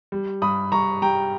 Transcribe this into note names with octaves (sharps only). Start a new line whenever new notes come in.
G3
G2 B5 D#6
G2 A#5 C#6
G3 G5 A#5